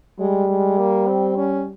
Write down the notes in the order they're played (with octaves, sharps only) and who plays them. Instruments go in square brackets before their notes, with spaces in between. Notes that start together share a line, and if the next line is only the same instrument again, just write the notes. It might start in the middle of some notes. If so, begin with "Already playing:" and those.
[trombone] G3 [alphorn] G#3
[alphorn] G#3
A#3
C4
C#4